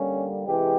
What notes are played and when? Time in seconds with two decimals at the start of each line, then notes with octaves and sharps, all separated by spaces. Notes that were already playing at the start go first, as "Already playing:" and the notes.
Already playing: D3 G3 A#3 C#4
0.47 C3 E3 G#3 G4